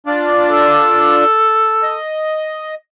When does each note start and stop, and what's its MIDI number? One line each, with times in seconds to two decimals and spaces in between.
0.06 1.24 62
0.06 1.24 65
0.06 1.24 74
0.51 1.96 69
1.83 2.75 75